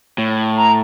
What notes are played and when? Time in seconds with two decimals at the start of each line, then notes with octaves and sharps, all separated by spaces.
0.18 A2
0.56 A#5